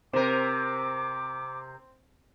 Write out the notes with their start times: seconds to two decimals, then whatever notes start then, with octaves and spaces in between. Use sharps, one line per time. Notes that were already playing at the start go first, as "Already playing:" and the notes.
0.13 C3 C4 A#4 D6